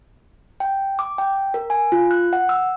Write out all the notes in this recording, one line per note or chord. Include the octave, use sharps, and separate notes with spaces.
G5
D6
G5
A#4
G#5
F4
F#6
F#5
E6